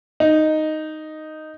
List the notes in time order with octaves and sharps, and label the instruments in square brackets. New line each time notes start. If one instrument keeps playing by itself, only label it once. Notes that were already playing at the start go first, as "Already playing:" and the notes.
[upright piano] D#4